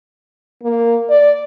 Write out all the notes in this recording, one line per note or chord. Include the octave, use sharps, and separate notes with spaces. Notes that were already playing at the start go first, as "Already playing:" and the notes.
A#3
D5